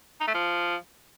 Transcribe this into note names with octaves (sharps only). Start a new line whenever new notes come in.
D#4
A3
F3